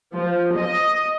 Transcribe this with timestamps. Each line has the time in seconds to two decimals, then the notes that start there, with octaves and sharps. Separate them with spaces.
0.14 F3
0.56 D#5